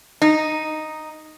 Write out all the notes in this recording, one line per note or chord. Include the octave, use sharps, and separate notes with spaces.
D#4